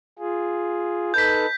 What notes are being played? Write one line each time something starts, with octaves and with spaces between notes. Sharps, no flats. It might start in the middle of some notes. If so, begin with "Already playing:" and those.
F4 G#4
D#4 A4 B4 G6 B6